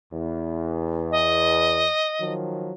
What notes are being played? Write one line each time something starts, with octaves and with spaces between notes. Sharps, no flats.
E2
D#5
D#3 F3 F#3